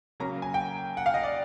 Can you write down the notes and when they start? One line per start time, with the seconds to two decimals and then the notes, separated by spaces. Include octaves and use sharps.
0.20 C#3 F#3 A#3 C#4 A#5
0.42 G#5
0.54 G5
0.97 F#5
1.06 F5
1.14 D#5
1.23 D5